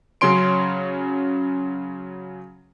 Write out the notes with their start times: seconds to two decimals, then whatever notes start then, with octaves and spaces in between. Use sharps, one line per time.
0.21 C#3 F#3 C#4 C#5 C6 D7